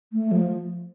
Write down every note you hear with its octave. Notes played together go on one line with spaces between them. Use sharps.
A3
F3